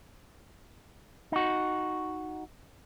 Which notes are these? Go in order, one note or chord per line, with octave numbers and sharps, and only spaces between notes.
D#4 F#4